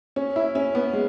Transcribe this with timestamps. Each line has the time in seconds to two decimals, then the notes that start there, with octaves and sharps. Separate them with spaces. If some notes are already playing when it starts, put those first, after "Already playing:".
0.16 C#4
0.36 E4
0.55 C#4
0.75 B3
0.93 G#3